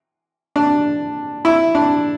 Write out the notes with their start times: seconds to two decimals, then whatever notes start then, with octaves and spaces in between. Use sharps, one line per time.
0.56 D4
1.45 E4
1.75 D4